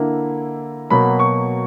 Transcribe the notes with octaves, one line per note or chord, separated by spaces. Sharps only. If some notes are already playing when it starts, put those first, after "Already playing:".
Already playing: D3 A#3 E4
B2 F#3 A#3 B5
C#6